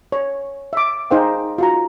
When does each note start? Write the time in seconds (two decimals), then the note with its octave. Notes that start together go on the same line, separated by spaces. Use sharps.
0.12 C#5
0.73 E5 D6
1.11 D#4 G#4 C5 F5 G5
1.58 F4 F#4 A#5